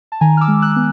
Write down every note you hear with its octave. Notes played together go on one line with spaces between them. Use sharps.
A5
D#3 G#5 A#5
F6
D6 E6
G#3
E6 F#6
B3